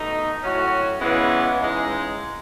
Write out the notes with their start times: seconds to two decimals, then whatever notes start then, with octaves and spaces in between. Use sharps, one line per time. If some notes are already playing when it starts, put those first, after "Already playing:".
Already playing: B2 A3 D#4
0.42 A2 F#3 C#4 F#4
1.00 C#3 E3 G#3 B3
1.59 C#3 E3 G#3 D#4